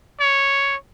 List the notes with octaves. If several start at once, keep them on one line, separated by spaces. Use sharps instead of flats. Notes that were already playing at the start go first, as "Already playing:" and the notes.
C#5